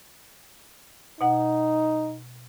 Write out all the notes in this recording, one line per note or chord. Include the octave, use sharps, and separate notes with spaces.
B2 D#4 F#5